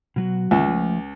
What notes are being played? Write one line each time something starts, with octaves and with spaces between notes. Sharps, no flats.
B2 F#3 F#4
C#2 D#3 E5
F3 A3